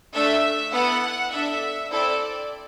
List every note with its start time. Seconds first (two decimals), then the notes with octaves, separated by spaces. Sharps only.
0.14 A3 D4 A4 E5
0.72 B3 E4 A4 F#5
1.32 D4 A4 E5
1.91 C4 E4 A4 D5